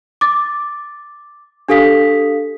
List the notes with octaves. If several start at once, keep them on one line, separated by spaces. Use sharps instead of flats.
D6 A6
D4 G4 A4 F5 D#6 B6